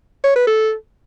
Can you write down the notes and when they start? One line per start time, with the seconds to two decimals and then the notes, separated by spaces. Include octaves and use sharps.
0.24 C#5
0.36 B4
0.47 A4